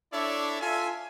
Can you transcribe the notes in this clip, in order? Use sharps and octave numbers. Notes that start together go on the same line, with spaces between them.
D4 E4 A4 C#5 D5 E5
F4 A4 E5 G#5